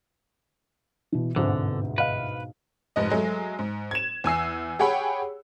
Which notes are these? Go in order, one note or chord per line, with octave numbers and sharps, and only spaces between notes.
B2 E3
G1 D2 G#2 B2 D3 C4
B4 D#5 F5
F1 G#2 D#5
F#3 G#3 A3
G#2
G#6 E7
E2 G#5 E6 C7
G4 G#4 C#5 F#5 G5 B5